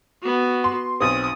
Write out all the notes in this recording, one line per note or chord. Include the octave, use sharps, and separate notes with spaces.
B3 F#4
C6
B1 C4 D#6